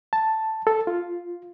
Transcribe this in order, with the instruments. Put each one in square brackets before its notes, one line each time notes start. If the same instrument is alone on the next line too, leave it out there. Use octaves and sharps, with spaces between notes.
[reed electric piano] A5
A4
F4